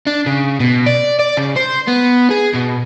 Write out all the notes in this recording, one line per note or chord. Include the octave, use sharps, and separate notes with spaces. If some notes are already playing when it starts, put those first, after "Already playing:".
D4
C#3
B2
D5
D5
C#3
C5
B3
G#4
B2